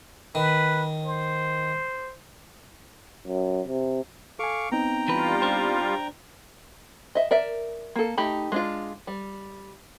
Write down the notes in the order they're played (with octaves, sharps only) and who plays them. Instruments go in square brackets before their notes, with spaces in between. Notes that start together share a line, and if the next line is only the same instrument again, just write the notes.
[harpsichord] D#3 [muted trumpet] B4
[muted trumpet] C5
[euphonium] F#2
C3
[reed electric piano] A4 G#5 [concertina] F5 C#6 D6
[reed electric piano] B3 C4 D#4 [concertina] G5 A#5
[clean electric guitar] E3 B4 [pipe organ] G3 F4
[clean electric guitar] D4 C5
[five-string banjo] D#5 E5
A#4 D5 E5
A#3 A4
A3 D#4 G4 B5
G#3 D4 F4
G3